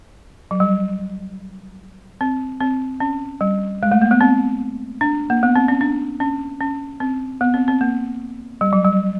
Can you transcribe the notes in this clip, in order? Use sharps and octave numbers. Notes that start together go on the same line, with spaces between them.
F#3
G3
C4
C4
C#4
G3
G#3
A3
A#3
B3
C4
D4
A#3
B3
C4
C#4
D4
C#4
C#4
C4
B3
C4
C4
A#3
G3
F#3
G3